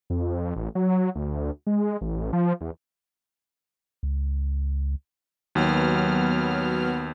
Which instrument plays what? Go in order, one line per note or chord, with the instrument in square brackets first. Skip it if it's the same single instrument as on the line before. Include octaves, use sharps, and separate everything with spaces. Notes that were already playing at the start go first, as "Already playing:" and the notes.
[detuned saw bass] F2
A1
F#3
D2
G#3
A1
F3
E2
[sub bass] C#2
[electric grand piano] D#2 [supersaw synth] F#3 B3 F6